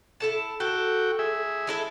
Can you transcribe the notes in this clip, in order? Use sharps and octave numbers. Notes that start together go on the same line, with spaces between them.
E4 A4 A5
F#4 A4 G5
G#4 E5
G#3 E4 A4